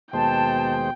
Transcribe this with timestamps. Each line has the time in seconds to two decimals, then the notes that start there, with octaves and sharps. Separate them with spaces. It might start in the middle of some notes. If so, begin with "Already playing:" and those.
0.13 D#2 B2 G#3 C5 G5 A5